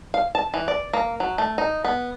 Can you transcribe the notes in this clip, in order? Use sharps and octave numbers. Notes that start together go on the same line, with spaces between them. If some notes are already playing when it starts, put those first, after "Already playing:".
F5
A5
E3
D5
A#3
F#3
A3
D#4
B3